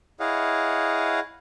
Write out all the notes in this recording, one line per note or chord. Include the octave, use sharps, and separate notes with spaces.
E4 G#4 C#5 D#5 F5 F#5